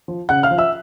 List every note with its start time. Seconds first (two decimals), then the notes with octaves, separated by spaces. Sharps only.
0.08 F3
0.29 C#3 F#5 F#6
0.43 F5 F6
0.51 F3
0.58 E5 E6